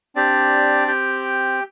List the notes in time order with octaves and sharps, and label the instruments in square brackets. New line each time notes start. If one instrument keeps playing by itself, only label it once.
[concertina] C4 D4 G4 D5
G4 G5